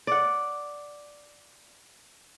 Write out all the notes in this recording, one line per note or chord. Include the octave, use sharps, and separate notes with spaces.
D5 F#5